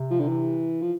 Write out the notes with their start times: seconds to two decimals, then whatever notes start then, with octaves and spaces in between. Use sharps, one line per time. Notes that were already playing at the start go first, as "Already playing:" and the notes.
Already playing: C3
0.10 F3
0.19 D3
0.28 E3
0.82 F3